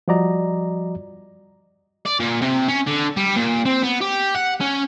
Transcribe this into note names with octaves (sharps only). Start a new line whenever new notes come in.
F3 G3 F#4 D5 D#5 A#5
D5
A#2
C3
C#4
D3
G3
A#2
C4
B3
G4
F#5
C#4